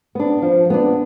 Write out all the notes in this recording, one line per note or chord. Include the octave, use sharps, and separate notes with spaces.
B3 D4
F3
B3 D4